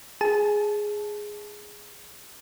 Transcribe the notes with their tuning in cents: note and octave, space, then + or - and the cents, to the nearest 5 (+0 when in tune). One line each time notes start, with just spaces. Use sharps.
G#4 +0 A5 -20